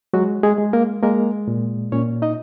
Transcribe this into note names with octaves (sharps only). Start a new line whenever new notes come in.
F#3 G#3 F#4
G#3 G#4
G#3
A#3 A#4
G#3 A#3 A#4
A#2
A#2 C#4 C#5
D#4 D#5